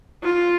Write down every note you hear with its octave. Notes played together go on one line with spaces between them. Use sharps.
F4